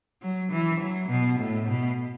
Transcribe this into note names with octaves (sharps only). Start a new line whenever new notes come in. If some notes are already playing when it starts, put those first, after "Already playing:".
F#3
E3
F#3
B2
A2
B2